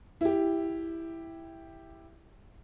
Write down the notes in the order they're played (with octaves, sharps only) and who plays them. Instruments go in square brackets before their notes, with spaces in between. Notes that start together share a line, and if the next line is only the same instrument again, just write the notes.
[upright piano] E4 G4